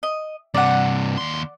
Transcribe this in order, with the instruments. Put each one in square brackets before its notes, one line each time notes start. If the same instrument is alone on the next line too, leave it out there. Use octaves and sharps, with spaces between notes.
[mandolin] D#5
[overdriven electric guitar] G2 C3 [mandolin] D5 F#5
[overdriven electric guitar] D#2 C6